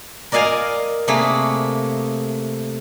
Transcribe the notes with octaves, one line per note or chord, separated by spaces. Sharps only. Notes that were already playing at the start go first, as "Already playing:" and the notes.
A#4 D5 D#5 F5 G#5 A#5
C3 A3 A#3 G#4